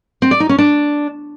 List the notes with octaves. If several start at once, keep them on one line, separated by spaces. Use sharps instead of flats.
C4
D5
D#4
C#4
D4